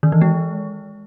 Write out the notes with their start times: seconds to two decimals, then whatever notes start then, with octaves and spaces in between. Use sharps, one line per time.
0.03 D#3
0.12 E3
0.22 G#3